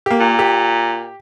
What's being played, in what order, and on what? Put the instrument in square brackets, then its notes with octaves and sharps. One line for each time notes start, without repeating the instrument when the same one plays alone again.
[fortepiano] A#3 G4
[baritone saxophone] A#2
[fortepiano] G4